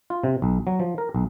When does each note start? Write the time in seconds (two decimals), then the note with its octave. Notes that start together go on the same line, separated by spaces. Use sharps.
0.10 F4
0.24 C3
0.42 B1
0.67 F#3
0.80 F3
0.98 A#4
1.15 B1